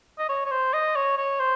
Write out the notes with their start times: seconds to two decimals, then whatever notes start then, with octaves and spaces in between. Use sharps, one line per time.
0.19 D#5
0.29 C#5
0.46 C#5
0.51 C5
0.73 D#5
0.96 C#5
1.18 C#5
1.40 C5